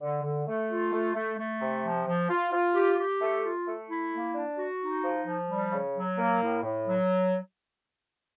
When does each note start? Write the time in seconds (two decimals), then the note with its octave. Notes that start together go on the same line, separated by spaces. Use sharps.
0.01 D3
0.23 D3
0.46 A3
0.70 F4
0.92 A3
1.14 A3
1.38 A3
1.61 C3
1.83 F3
2.06 F3
2.29 F4
2.52 F4
2.74 G4
2.98 G4
3.21 A3
3.43 F4
3.66 A3
3.89 E4
4.13 A#3
4.34 D4
4.58 F#4
4.81 D#4
5.04 F3
5.26 F3
5.49 G3
5.72 C#3
5.95 F#3
6.17 A#3
6.41 A2
6.63 A2
6.87 F#3